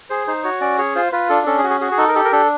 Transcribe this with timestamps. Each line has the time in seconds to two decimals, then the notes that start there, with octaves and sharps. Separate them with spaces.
0.10 G#4 C5
0.27 D#4 C5
0.44 F#4 C#5
0.61 C#4 D5
0.78 G#4 C#5
0.95 F4 C5
1.12 F4 B4
1.29 D4 A4
1.46 C#4 A4
1.58 G#4
1.64 F#4
1.70 G#4
1.81 F#4 G#4
1.91 G#4
1.97 D#4 A4
2.08 A#4
2.15 G4 A4
2.25 A#4
2.32 D4 A4